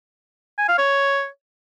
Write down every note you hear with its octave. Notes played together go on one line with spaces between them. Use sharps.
G#5
F5
C#5